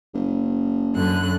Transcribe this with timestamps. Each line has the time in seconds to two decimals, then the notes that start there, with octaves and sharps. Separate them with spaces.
0.14 F#1
0.94 F#2 D3 F#6